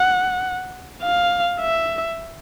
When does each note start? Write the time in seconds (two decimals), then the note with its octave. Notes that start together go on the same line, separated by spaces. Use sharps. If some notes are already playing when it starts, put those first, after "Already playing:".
Already playing: F#5
1.02 F5
1.61 E5